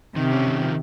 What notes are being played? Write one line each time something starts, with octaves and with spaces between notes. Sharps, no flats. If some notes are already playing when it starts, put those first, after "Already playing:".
C3 D#3
C#4
D#3
F3